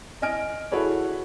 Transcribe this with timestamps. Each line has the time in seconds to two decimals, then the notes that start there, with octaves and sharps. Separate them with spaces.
0.22 D#5 G#5 F6 D7
0.72 E4 F#4 G#4 A4 B4 C#5